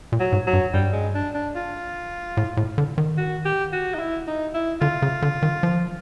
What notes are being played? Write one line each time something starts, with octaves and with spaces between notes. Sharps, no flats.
A#2
F#3
G#2
F#3
G2
G2 G3
G#3
D4
D4
F4
A2
A2
D3
D#3
F#4
G4
F#4
D#4
E4
D#4
E4
D3 F4
C#3
D3
D#3
F3